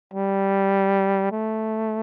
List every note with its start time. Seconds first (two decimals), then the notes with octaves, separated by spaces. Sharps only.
0.14 G3
1.32 A3